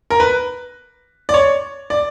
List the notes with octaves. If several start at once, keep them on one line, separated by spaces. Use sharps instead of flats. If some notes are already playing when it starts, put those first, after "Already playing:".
A#4
B4
D5
C#5
D5